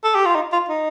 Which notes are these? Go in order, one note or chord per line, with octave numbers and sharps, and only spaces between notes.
A4
G4
F4
D#4
F4
D#4